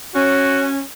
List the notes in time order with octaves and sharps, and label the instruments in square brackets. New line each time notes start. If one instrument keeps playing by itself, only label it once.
[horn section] C#4 [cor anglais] F#4